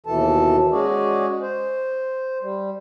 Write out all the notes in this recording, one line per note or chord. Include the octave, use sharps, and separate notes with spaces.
D#2 B2 E3 A4 A5
G#3 C#4 F#4 G#4 D5
C5
G3